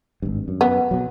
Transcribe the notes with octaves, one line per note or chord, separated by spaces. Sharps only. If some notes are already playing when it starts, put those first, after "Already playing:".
G#1 G2
F#2
B3
B2 F#3